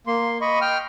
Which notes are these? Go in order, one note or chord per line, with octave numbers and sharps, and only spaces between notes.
A#3 C6
D#5 B5 C#6
G5 F6